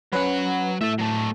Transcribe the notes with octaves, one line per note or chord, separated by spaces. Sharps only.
F#3 C#4 B4 F#5
A2 A4 E5
F#3 A3